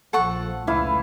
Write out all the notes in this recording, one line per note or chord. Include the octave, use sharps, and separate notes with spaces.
A#1 F3 A4 F#5 C#6
F1 C#2 E3 A3 E4 F5